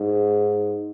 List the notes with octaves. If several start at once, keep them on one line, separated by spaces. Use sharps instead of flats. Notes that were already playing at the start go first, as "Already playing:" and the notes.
Already playing: G#2